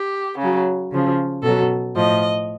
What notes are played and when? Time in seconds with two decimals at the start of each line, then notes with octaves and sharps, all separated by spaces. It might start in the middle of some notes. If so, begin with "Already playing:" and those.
Already playing: G4
0.39 C#3 F#3
0.91 C#3 F3
1.43 B2 F#3 A4
1.95 A2 F3 D#5